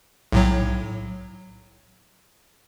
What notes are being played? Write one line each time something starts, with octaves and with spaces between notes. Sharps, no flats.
B1 A2 F#3